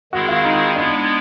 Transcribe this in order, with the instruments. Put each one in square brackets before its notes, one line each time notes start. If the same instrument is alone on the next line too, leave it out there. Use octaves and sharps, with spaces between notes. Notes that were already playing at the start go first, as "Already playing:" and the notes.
[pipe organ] D#3 G#3 C4 E4 G#4 [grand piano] F#4
[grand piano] F4
D#4
[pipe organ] G#3 B3 E4 [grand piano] D4